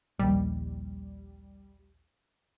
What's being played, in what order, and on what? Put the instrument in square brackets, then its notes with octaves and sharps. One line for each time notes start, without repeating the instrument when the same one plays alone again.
[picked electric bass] A#1 D#2 [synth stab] G3